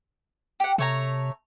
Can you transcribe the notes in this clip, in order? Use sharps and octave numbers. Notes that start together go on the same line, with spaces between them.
G4 F#5
C3 A3 C#5 A#5